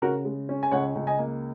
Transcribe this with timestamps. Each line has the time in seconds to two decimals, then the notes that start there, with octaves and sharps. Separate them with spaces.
0.02 C#3 F#4 A#4
0.25 G#3
0.49 C#4
0.63 G#5
0.71 C#2 C#5 F#5
0.95 C#2
1.07 D#5 G#5
1.19 A#3